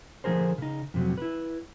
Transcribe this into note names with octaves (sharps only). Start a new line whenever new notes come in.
D3 F3 G4 G#4 A#4 C5
C#3 D#4
F2 C3 F#3
E4 B4